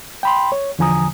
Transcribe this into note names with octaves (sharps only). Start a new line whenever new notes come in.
G5 B5 C6
C#5
E2 D3 F3 G#5 A#5 D#6